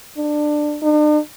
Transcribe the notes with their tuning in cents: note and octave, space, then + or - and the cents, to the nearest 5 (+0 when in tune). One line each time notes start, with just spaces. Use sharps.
D4 +20
D4 +45